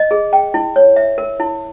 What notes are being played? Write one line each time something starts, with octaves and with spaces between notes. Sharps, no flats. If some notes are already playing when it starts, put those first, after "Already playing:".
Already playing: D#5
G#4
G5
E4
C#5
E5
A#4
E4